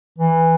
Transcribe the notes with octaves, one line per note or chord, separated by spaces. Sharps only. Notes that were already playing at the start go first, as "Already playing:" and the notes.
E3